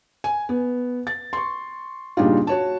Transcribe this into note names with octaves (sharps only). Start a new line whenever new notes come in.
G#5
B3
A6
C6 C#6
A#2 C#3 G3 D4 D#4 F4
F#4 C#5 A5